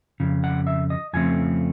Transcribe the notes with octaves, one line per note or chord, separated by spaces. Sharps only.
F2 C#3
F#5
E5
D#5
F2 C#3 F3 A3 C4 G#5